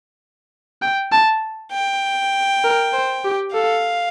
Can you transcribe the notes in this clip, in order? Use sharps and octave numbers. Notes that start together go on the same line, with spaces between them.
G5
A5
G5
A#4
C5
G4
A4 F5